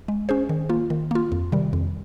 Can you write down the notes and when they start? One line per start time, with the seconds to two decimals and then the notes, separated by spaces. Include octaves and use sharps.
0.08 G#3
0.29 C#4 G#4 C5
0.49 D#3
0.69 A#3 F4
0.90 D#3
1.11 A#3 F4
1.32 F2
1.52 C3 D#3 G3
1.73 F2